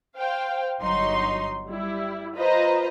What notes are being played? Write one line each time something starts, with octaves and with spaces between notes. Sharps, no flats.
C5 F5 G5
G1 F#3 D#4 C6
G3 E4
F4 B4 C5 D#5 A#5